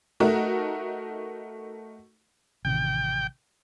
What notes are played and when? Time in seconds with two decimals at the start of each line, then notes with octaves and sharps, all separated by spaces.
0.20 A3 D#4 F#4 A#4
2.65 A1 C3 D#3 G5